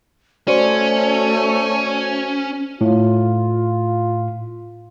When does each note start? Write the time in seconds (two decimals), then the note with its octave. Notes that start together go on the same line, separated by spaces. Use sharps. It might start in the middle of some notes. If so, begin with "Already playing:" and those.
0.48 A3 C#4 F#4 C5 D5
2.81 A2 F4